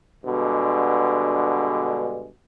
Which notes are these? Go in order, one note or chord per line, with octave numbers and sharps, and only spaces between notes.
G2 B2 D3 G#3